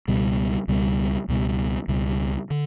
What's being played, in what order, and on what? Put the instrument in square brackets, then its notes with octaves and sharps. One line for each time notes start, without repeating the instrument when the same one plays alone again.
[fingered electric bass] C#2 B2 G3
C#2 B2 G3
C#2 B2 G3
C#2 B2 G3
D3